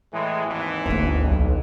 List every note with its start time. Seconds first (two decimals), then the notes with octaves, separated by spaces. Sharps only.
0.14 A2 E3 G#3
0.47 G#1 D#2 E3
0.86 G1 D2 A#3
1.25 B1